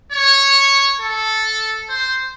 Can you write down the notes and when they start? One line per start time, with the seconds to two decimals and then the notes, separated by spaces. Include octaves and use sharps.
0.12 C#5
1.01 A4
1.90 C5